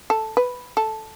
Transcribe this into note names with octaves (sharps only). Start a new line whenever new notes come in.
A4
B4
A4